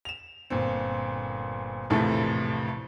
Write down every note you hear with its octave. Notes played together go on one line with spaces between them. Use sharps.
E7 F7
G1 A#2 C4
A#1 F2 A2 C3 E3 A3